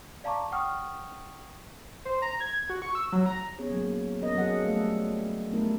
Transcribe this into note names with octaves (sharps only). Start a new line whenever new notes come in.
D5 F5 A5 A#5 C#6 D6
F#5 G5 C#6 D#6 F6
C5
A#5
G#6
F#4
C#6
E6
F#3
A#5
B3 C#4 G#4 C#5
F#3 A#3
B3 C#4 A#4 D#5
F#3 G#4 A4 F#5
G3 A3 A4 F5
G3 A3 B3 D4 E4 A#4